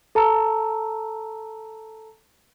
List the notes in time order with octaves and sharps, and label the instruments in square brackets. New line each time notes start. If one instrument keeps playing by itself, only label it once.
[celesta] A4 A5 A#5 E6